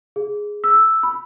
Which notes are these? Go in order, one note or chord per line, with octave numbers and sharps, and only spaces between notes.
G#4
E6
B5